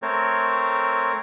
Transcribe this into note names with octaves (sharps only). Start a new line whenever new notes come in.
A3 C4 A#4 C#5